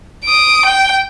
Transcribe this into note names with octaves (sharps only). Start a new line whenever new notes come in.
D#6 D7
G5